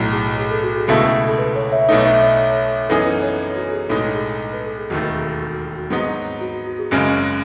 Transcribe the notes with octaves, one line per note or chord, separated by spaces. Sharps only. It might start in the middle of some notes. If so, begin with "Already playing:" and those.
Already playing: B1 A2 F#3
G#4
G#4
A4
F#4
G#4
C#2 B2 A3 E4 A4
A4
B4
C#5
C#5 E5
B1 B2 A3 D#4
C#5 E5
C#5
F#2 E3 B3 D#4 G#4 A4
B4
C#5
F#4
A4
G#4
B1 A2 G#3 D#4 A4
G#4
B4
A4
G#4
E1 D#2 D#3 A3 F#4
G#4
F#4
F#4
G#2 F#3 B3 D#4 G#4
F#4
F#4
G#4
F#1 F#2 C#3 G#3